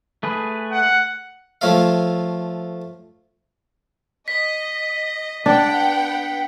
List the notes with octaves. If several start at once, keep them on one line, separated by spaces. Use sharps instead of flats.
A3 G#4 B4
F#5
F3 A3 C#5 F5
D#5 B6
B3 D4 F#5 G5